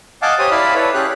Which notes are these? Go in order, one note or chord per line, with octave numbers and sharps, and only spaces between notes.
D#5 F5 F#5 G#5 A5 D6
G4 C5 C#5 D#6
E4 D5 F5 A5 B5
E4 A4 B4 C#5
C#4 G4 G#4 F#6